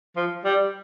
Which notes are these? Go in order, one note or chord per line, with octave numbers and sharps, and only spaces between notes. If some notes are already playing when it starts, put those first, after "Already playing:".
F3
G3